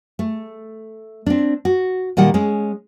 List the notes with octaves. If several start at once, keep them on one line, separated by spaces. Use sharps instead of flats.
A3
C4 D4
F#4
A#2 D#3 G3 F#5
G#3 C#4